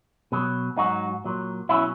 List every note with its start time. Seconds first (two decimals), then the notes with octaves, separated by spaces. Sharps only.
0.32 B2 F#3
0.77 G#2 F#3 D#4 F#4
1.25 A#2 F#3
1.69 B2 F#3 C#4 E4